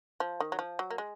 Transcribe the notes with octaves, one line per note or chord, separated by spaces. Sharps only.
F3
D#3
F#3
F3
F#3
A#3
G#3